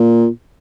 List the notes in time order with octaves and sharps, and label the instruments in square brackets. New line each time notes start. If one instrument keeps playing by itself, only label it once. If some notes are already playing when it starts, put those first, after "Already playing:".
Already playing: [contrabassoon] A#2